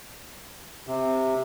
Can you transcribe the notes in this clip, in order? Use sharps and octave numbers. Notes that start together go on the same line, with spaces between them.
C3